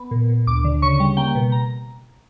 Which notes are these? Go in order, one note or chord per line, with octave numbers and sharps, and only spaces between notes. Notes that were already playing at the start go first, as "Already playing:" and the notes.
Already playing: B3
A#2
A#2
D2 D6
D3
C#3 C#6
G3
A#3 G5
B2
A#5